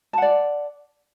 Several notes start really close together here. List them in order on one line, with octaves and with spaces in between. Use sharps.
A5 F#5 D5